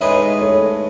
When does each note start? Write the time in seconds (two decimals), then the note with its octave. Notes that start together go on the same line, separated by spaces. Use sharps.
0.01 A2 G#3 D#4 G#4 B4 C#5 E5
0.41 A4 C#5